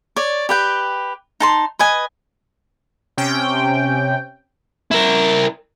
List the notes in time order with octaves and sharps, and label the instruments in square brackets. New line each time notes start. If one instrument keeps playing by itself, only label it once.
[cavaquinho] C#5 D5
G4 B4 G5
D#4 A5 C6
B4 D#5 G#5
[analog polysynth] C3 C#4 G5
[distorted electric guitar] E4 A#4